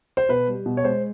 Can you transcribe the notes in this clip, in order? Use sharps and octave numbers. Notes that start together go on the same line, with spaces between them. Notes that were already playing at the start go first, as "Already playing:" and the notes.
C5
B2 B4
G3
B2
C#5
G#3 C5